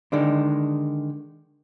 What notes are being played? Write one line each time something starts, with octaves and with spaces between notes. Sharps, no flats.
D3 D#3 G#3 D4